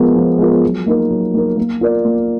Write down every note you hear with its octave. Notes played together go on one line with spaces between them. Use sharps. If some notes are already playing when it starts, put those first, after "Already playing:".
Already playing: F3 G#3 B3 F4 A#4
F3
G#3 B3 F4 A#4
F#3
A#3 D#4 A#4
F#3
A#3 D#4 A#4
A#3
F4 A#4 D5
A#3